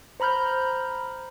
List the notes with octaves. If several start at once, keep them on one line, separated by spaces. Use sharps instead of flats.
C5 A#5 B5 F6 G6